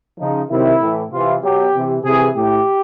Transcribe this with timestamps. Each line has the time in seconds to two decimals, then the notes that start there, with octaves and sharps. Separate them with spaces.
0.18 C#3 F3 D#4
0.50 C3 D#3 F#3 E4
0.81 A2 E3
1.12 C3 E3 F4
1.42 B2 F#3 G4
1.74 C3 E3
2.05 C3 E3 G#4
2.35 A2 E3 G4